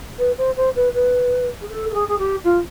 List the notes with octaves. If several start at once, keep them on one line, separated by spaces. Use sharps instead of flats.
B4
C5
C5
B4
B4
G#4
A4
A4
G#4
G#4
G4
F4